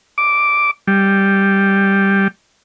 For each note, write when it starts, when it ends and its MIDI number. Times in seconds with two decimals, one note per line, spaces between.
0.18 0.71 86
0.87 2.28 55